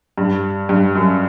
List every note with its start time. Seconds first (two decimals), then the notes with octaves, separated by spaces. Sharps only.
0.18 G2
0.69 G2
0.95 F#2